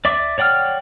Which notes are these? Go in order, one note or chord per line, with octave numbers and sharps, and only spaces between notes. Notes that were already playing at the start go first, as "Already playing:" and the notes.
D5 E5 D6
C#5 D5 F#5 G5 F6